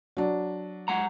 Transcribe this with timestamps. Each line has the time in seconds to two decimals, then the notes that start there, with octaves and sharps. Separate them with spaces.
0.17 F#3 D4
0.88 G#3 F#5 A#5